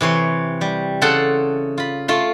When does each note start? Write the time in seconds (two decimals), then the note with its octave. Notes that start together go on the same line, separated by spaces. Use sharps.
0.01 C3 E3 C#5 C6
0.61 G3
1.02 C#3 A4 F#5 A5 C6
1.78 F4 B5
2.08 A3 F4 C6